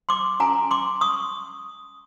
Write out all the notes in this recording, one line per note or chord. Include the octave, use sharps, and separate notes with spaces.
C6 D6
C#4 F4 A4 G#5 A#5
C6 D6
C#6 D#6